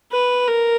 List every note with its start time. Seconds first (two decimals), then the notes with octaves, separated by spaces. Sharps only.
0.12 B4
0.48 A#4